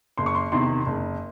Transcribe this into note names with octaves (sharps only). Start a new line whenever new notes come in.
F#1 C6
C#6
C6
E2 C3 D#3 C6
F#1